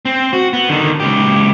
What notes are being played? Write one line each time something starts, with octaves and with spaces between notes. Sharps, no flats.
C4
F#4
B3
D3 D#3
C#2 G4